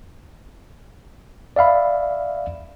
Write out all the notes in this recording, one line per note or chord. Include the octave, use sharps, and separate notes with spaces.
D5 E5 F5 B5